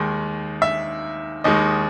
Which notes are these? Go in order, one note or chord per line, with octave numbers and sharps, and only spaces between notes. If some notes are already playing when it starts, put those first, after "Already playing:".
Already playing: D#2 D#3 G#3
E5
D#2 D#3 G#3 D#5